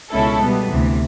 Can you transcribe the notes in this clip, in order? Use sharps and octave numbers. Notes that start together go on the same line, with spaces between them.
C#2 B2 G#3 C#4 E4 A4
B2 G3 B3
D2 C3 E3